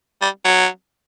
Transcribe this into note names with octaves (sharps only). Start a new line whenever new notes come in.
G3
F#3